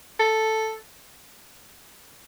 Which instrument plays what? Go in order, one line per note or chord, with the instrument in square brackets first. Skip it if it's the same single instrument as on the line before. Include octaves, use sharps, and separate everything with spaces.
[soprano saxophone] A4